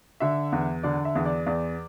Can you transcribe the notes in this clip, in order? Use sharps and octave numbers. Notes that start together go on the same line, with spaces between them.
D3 E5
E2
D3 D5
E5
E2
D5
E2 D5